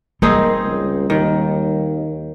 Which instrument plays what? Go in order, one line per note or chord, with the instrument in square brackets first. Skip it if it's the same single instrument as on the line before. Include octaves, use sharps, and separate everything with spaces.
[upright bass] G3 [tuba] A#3 [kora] C4 D#4 G#4
[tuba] C#2
[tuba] D#2 [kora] D#3